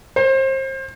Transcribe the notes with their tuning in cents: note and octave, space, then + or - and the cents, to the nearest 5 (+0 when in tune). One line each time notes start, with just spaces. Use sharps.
C5 +30